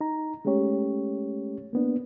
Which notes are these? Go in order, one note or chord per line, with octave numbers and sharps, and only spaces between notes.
D#4 A#5
G#3 A3 C#4 G4 C#5
A#3 B3 D4